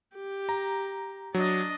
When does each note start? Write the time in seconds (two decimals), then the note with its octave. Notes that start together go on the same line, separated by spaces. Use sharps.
0.15 G4
0.49 A#5
1.34 F#3 D4 D#5